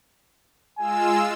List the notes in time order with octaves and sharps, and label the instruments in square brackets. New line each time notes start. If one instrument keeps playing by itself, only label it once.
[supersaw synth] G#3 F4 E6 [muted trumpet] G#5